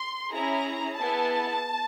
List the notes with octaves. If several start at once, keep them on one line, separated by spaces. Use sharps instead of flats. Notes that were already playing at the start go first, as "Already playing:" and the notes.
Already playing: C6
C#4 E4 G#4 A#5
B3 E4 G#4 A5